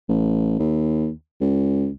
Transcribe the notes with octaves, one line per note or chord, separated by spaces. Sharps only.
A1
D#2
C#2